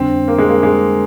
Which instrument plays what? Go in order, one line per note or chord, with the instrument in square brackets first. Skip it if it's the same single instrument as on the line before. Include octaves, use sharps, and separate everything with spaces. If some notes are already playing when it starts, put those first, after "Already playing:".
Already playing: [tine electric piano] F2 D3 G3 D4 [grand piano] C4
[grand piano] A#3
G#3
A#3
G#3